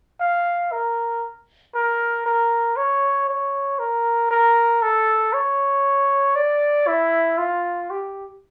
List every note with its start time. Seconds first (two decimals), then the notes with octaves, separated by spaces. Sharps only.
0.20 F5
0.72 A#4
1.75 A#4
2.26 A#4
2.76 C#5
3.29 C#5
3.79 A#4
4.31 A#4
4.82 A4
5.33 C#5
6.35 D5
6.87 E4
7.38 F4
7.90 G4